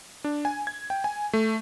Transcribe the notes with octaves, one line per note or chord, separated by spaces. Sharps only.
D4
G#5
G#6
G5
G#5
A3